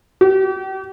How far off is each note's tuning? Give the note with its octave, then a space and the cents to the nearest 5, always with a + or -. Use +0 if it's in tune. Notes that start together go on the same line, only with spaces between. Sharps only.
G4 -40